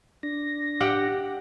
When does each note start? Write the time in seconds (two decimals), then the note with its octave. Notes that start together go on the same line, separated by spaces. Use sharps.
0.23 D4 A#6
0.80 G4 F#5 G5